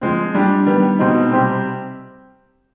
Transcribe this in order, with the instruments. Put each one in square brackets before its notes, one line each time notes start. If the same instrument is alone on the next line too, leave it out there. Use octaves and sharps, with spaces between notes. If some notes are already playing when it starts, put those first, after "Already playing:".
[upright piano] F3 G#3 C4
G3 D4 G4
D#3 G3 B3
B2 G#3 C4 D#4
C3 G3 C4 G4